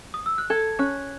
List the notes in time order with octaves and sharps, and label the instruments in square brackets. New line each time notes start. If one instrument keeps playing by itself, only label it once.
[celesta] D#6
E6
F#6
[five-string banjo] A4 [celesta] G#6
[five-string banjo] C#4 [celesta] F#6